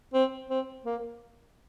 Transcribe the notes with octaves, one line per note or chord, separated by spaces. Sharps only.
C4
C4
A#3